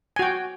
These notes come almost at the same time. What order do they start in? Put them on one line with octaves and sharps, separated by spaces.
G#5 F#4 G5